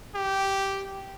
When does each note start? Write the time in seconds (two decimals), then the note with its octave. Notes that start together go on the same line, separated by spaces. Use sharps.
0.15 G4